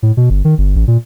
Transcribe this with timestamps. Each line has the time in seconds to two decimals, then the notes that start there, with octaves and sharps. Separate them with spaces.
0.03 A2
0.17 B2
0.30 G1
0.45 D#3
0.58 G1
0.76 A1
0.88 A#2